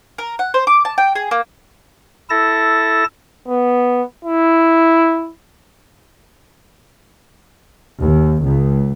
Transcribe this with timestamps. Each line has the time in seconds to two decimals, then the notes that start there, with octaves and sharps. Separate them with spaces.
0.18 A#4
0.39 F#5
0.54 C5
0.67 D6
0.85 A5
0.98 G5
1.15 G#4
1.31 A#3
2.30 E4 A4 A5 A#6
3.48 B3
4.25 E4
7.98 D#2
8.45 C#2